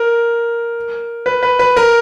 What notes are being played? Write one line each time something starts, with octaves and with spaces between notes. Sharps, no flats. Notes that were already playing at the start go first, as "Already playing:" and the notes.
Already playing: A#4
B4
B4
B4
A#4